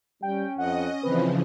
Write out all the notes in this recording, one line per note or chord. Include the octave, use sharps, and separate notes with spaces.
G3 C#4 G5
F2 D#5 F#5
C#3 E3 F3 C4 B4